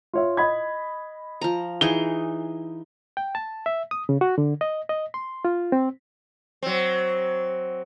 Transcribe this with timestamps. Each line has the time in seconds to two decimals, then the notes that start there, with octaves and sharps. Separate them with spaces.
0.13 F4 C#5 E5
0.37 D#5 B5 G#6
1.41 F3 A#5
1.81 E3 D#4 G#4 G7
3.17 G5
3.35 A5
3.66 E5
3.91 D#6
4.09 C#3
4.21 F#4
4.38 D3
4.61 D#5
4.89 D#5
5.14 C6
5.45 F4
5.72 C4
6.63 F#3 C4